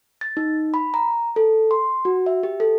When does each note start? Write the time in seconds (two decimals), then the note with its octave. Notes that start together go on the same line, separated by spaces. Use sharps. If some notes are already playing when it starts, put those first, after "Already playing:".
0.21 A6
0.37 D#4
0.74 B5
0.94 A#5
1.36 A4
1.71 C6
2.05 F#4
2.26 E5
2.43 G4
2.60 A4